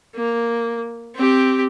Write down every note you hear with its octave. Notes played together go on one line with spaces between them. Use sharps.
A#3
C4 G4